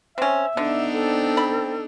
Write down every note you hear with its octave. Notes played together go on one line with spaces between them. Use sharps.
C4 C#4 E5
D3 B3 D4 D#4
C4 A4
B5